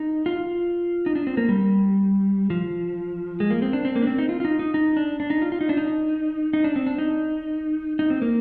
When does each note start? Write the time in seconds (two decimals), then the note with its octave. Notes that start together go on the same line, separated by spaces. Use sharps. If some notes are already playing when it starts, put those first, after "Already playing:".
Already playing: D#4
0.26 F4
1.06 D#4
1.15 D4
1.27 C4
1.37 A#3
1.49 G3
2.50 F3
3.40 G#3
3.50 A#3
3.62 C4
3.73 D4
3.85 C4
3.96 A#3
4.02 D4
4.07 C4
4.18 D#4
4.29 F4
4.40 F4
4.45 D#4
4.59 D#4
4.74 D#4
4.97 D4
5.20 D4
5.30 D#4
5.42 F4
5.52 F4
5.61 D#4
5.69 D4
5.77 D#4
6.53 D#4
6.64 D4
6.76 C4
6.86 D4
6.98 D#4
7.99 D#4
8.10 C4
8.22 A#3